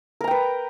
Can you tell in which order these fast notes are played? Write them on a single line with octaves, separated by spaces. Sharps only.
A#4 A#5 G5 B4